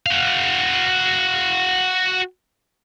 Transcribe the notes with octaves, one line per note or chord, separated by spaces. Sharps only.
F#4 F5